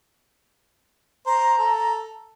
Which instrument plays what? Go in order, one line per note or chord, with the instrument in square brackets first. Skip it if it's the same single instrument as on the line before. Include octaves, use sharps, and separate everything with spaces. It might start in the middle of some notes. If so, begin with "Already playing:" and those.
[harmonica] C5 [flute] A#5
[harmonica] A4